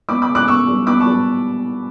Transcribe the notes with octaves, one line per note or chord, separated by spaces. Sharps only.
B3 B5 D6
B5 D6
C#3
D6 F#6
B3 C#6 E6
G3
B3 B5 D6
A5 C#6
G3